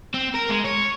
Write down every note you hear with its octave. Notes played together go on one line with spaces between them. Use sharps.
C4
A#4
G#3
C#5